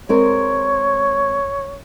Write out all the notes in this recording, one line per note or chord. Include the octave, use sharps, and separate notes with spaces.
G#3 C4 A#4 C#5